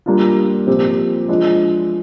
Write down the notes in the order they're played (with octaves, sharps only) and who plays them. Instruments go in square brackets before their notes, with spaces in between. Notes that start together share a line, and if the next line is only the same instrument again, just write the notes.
[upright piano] G3 A#3 D4 F4
A#2 F3 C4 G4
F3 G#3 D4